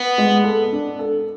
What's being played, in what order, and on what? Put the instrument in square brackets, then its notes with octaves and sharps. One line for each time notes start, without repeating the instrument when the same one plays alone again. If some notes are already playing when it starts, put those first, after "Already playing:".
Already playing: [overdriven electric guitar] B3
[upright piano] G#3
A4
D4
A4